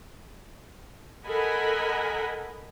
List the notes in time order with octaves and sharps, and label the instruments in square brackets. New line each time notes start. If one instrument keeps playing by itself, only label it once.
[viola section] A4 A#4 D#5 F#5 G#5 B5